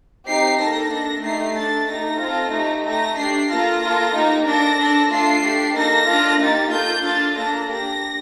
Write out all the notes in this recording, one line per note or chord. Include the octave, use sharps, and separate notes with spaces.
C4 D#4 G4 C7
A#3 D#4 A4 A#6
D4 A4
A3 D#4 G4 C7
D4 A4 A6
A3 D#4 G4 A#6
C4 F4 A4
A3 D#4 G4
A3 D#4 G4 A#6
D4 G4 C7
A#3 F4 A4 A#6
A#3 F4 A4
A#3 D#4 G4
D4 A4 A#6
D4 A4
A3 D4 F4 A4 C7
D4 G4
A#3 D#4 A4 A#6
D4 F4 A4
A#3 D#4 G4 A6
A#3 F4 A4 G6
D4 F4 A4 A6
A#3 D4 A4 A#6
D4 G4 A#6